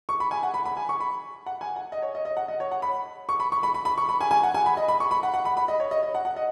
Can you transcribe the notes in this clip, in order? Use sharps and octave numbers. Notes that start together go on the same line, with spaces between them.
C#6
B5
G#5
F#5
B5
B5
G#5
C#6
B5
F#5
G#5
F#5
D#5
C#5
D#5
D#5
F#5
D#5
C#5
F#5
B5
C#6
B5
C#6
B5
B5
B5
C#6
B5
G#5
G#5
F#5
G#5
B5
D#5
B5
C#6
B5
F#5
F#5
B5
B5
D#5
C#5
D#5
D#5
F#5
F#5
D#5